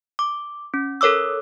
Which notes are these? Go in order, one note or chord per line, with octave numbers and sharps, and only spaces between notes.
D6
C#4
A4 A#4 C#5 D6 E6